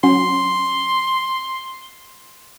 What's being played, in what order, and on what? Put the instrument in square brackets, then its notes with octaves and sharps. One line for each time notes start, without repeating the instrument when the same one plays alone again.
[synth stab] F#3 C#4 [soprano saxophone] C6